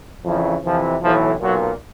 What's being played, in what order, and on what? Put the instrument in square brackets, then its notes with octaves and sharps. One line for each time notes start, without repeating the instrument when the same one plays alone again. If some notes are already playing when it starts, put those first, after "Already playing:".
[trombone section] F2 C#3 E3 F3
F2 C3 E3 F3
B1 A2 E3 F3
B1 A#2 F#3